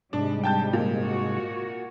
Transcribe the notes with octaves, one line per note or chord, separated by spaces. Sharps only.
G#2 C3 G3 G#3 D4
G5 A5 G6
A#2
F#4